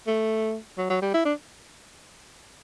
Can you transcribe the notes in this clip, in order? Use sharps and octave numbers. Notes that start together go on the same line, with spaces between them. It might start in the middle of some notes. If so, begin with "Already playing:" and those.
A3
F#3
F#3
G3
E4
D4